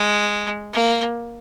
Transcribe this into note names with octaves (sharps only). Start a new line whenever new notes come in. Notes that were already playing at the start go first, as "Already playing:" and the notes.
Already playing: G#3
A#3